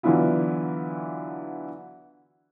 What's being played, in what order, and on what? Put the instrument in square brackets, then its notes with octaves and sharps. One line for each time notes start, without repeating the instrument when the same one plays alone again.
[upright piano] D3 E3 F#3 B3 E4 F4